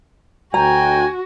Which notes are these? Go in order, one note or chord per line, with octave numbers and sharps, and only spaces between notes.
D2 F#4 G5 G#5 A#5